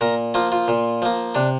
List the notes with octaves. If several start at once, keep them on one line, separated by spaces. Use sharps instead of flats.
A#2 A#4
F3 A#3 F4
F4
A#2
F3 A#3
C3 D4